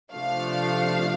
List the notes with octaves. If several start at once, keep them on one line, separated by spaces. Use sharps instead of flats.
C3 F3 A3 D4 F5